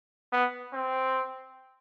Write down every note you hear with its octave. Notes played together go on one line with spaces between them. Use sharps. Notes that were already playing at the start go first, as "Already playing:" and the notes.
B3
C4